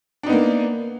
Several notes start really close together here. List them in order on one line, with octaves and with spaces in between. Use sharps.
D4 D#4 B3 A#3